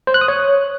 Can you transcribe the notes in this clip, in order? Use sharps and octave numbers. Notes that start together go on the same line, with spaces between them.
C5
F#6
D#6
C#5